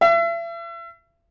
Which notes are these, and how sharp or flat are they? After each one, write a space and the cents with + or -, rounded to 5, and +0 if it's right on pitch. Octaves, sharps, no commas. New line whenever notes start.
E5 +40